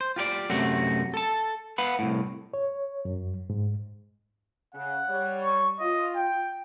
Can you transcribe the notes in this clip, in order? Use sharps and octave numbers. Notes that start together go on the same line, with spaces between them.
C5
F4 G4 A#4 D5
F#2 C3 A3 F#4
A4 A5
B4 F5 F#5 B5
C2 A2
C#5
F#2
G#2
C#3 F#5
G3 C#5
C#6
F4 D#5
G5